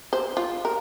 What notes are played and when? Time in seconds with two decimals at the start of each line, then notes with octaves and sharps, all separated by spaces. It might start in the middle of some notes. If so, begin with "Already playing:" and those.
0.13 C5
0.37 F4
0.65 A#4